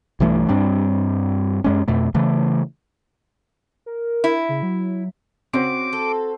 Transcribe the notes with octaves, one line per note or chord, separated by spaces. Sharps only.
B1 G2 E3 A3
G2 G3 C4 D4
F#2 G#3 C#4
F2 B2 A3
C#3 E3 A3
A#4
E4
C#3
F#3
C#3 C4 F#4 C5 D6
A4